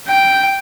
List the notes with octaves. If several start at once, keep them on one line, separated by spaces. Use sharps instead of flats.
G5